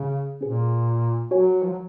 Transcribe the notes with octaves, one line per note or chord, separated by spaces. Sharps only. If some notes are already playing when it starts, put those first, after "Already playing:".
Already playing: C#3
A#2 C#4 G#4 C5
F#3 F#4 A#4 C#5 G#5
F3
F#3